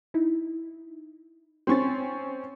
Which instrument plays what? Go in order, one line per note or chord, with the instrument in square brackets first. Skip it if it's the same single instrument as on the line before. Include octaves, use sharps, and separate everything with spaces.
[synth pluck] D#4 E4
[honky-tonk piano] C4 C#4 [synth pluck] C6 C#6 A6